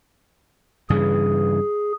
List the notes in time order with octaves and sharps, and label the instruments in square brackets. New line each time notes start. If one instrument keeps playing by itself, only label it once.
[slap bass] G2 C#3 E3 [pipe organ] G#4